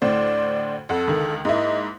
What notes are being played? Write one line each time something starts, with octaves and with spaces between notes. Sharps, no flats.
D2 A2 C5 D5
F2 A4 F#5
C#2 D3 D#3
G#2 A#3 E4 D#5